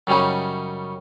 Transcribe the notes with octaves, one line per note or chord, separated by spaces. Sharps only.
F#2 C#3 G3 C#4 D#4